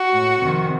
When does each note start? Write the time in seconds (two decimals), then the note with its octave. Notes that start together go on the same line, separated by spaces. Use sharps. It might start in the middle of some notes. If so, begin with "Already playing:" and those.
Already playing: F#4
0.11 A2
0.39 F2 C3 D#3